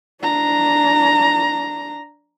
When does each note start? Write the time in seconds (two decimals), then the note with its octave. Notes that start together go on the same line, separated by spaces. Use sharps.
0.21 D4 A#5